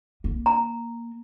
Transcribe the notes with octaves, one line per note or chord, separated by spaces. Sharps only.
A#3
A#5